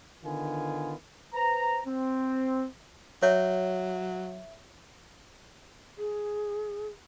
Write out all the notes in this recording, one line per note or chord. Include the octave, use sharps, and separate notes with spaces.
D3 D#3 B3 F4 G#5
B4 C5 A#5
C4
F#3 C#5 E5
G#4